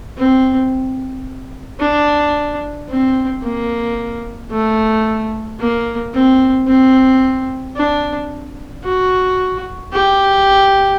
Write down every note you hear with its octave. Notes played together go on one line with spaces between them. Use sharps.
C4
D4
C4
A#3
A3
A#3
C4
C4
D4
F#4
G4